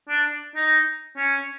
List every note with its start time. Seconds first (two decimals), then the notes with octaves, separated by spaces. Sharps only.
0.09 D4
0.56 D#4
1.17 C#4